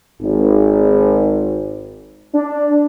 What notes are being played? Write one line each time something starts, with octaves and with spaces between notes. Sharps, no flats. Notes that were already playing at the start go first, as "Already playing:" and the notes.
G#1
D4